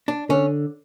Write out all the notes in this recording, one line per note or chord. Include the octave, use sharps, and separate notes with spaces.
D4
D3 C#4